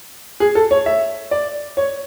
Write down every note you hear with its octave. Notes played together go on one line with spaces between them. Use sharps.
G#4
A4
C#5
E5
D5
C#5